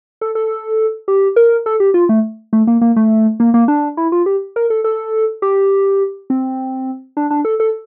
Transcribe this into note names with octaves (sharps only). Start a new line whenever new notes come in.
A4
A4
G4
A#4
A4
G4
F4
A3
A3
A#3
A#3
A3
A#3
A#3
D4
E4
F4
G4
A#4
A4
A4
G4
C4
D4
D4
A4
A4